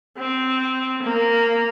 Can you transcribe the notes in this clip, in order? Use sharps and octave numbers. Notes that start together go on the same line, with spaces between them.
C4
A#3